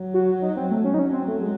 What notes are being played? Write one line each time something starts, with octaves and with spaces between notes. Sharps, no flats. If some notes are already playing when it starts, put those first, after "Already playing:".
Already playing: F#3
F#4
D#4
C4
A3
C#4
D#4
F#3 C#4
C4
A3
G#3